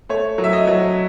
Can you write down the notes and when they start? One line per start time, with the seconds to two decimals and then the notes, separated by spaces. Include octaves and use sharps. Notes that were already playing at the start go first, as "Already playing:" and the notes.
0.09 A3 C#5
0.38 F#3
0.44 E5
0.53 D#5
0.67 F#3